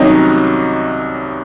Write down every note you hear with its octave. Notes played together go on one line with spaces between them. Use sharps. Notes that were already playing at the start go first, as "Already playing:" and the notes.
Already playing: C2 C3 D#3 F#3 C#4 D#4 C#5 D#5